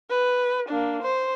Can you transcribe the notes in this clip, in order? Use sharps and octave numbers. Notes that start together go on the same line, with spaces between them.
B4
A#3 D4
C5